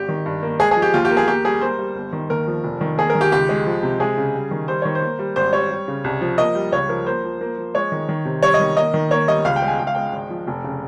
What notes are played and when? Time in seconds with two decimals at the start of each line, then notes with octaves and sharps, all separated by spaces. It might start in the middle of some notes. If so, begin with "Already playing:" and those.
Already playing: G#1 G4
0.09 D#3
0.26 G2
0.43 A#3
0.60 G#3 G#4
0.71 G#4
0.76 F3
0.82 G4
0.94 D#2 F4
1.05 G4
1.11 A#3
1.17 G#4
1.28 A#3 G4
1.45 G3 G#4
1.61 A#3 C5
1.79 G3
1.96 G1
2.13 D#3
2.30 D#2 A#4
2.47 F3
2.64 F1
2.81 D#3
2.98 A#3 G#4
3.10 A#4
3.15 D#3
3.21 G4
3.32 C#2 G4
3.49 G#3
3.66 F3
3.83 C3
4.00 G#3 G#4
4.17 C#3
4.34 G3
4.51 D#3
4.68 G3 C5
4.82 D#3 C#5
4.95 C5
5.02 A#3
5.19 G3
5.36 G#1 C5
5.53 G3 C#5
5.71 G3
5.88 C#3
6.04 C2
6.21 F3
6.38 A#3 D#5
6.55 G3
6.72 C#2 C#5
6.89 F3 A#4
7.06 A#3 C5
7.24 F3
7.41 A#3
7.58 F3
7.74 G#3 C#5
7.92 D#3
8.09 D#3
8.25 C3
8.42 G3 C#5
8.54 D#5
8.60 D#3
8.77 A#3 D#5
8.94 D#3
9.11 A#3 C#5
9.28 G3 D#5
9.45 C#2 F5
9.56 G5
9.62 G#3
9.68 G#5
9.79 C#2 G5
9.87 F5
9.95 G#3 G5
10.12 G#1
10.30 F3
10.47 F1
10.64 C#3